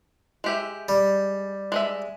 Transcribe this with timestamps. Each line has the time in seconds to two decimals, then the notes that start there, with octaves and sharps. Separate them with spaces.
0.44 G#3 G4 E5
0.89 G3
1.72 G#3 D#5 E5